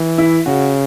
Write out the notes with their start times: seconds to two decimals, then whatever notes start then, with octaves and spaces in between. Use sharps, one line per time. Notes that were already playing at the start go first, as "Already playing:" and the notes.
Already playing: E3
0.18 E4
0.46 C#3 F#4